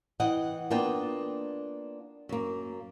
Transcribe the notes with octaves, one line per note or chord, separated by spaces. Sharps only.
E3 D#5 F#5 G5
A#3 B3 D4 F4 G5
F#2 A#3